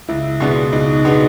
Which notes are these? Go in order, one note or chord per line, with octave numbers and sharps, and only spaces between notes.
C#2 E4
B2 G#3 B3 D4
C#2 D#4
B2 G#3 B3 D4